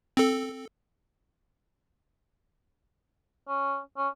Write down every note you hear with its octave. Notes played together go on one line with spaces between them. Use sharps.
C4 A4
C#4
C#4